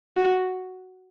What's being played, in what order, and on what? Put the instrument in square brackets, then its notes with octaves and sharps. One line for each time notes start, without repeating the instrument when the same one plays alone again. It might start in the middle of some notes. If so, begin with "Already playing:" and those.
[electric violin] F#4